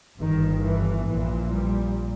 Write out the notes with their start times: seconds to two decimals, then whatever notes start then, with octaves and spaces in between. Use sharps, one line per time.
0.19 G1 G2 D#3
0.64 E3
1.07 A#1 A#2 E3
1.52 G3